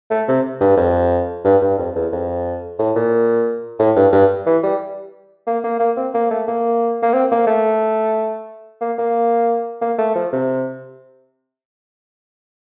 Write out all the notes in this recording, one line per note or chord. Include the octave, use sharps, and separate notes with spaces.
A3
C3
G2
F2
G2
G2
F2
E2
F2
A2
A#2
A2
G2
G2
E3
G3
A#3
A#3
A#3
C4
A#3
A3
A#3
A#3
C4
A#3
A3
A#3
A#3
A#3
A3
F3
C3